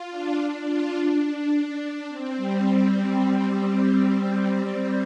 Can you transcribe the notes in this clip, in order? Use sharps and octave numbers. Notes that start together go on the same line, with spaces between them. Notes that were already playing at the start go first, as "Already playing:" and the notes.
Already playing: F4
D4
F4
D4
C4
G3